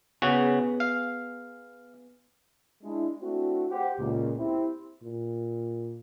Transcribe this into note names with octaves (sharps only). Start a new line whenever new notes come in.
C#3 B3 F#4 G#4
F5
G#3 D4 E4
A3 C4 D4 E4 F#4
G4 C5 F#5
C#2 A#2
C4 E4 G4
A#2